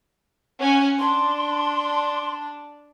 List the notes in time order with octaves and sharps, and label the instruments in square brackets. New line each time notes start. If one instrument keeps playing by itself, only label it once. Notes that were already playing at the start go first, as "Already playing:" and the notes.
[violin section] C#4 F#5 G#5
[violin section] D4 [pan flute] C6